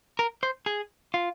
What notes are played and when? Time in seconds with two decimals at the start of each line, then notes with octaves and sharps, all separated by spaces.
0.19 A#4
0.43 C5
0.66 G#4
1.14 F4